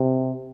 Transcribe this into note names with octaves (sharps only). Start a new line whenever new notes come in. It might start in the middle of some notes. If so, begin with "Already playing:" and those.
Already playing: C3